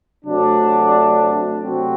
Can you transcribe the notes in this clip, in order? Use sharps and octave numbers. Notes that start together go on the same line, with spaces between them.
C3 F#3 A3 D4
C3 F#3 A3 C4 F#4